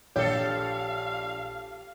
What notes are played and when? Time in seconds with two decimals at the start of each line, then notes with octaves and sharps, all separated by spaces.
0.16 A#1 G4 A4 C#5 F5